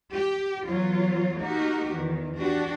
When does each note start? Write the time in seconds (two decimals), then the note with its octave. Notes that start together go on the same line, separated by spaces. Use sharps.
0.14 G4
0.68 E2 F#3 F4
1.41 A#3 D#4 F#4 G4 A#4
1.93 E2 D#3
2.38 D4 F#4 G4